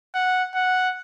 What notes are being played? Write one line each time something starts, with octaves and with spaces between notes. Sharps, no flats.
F#5
F#5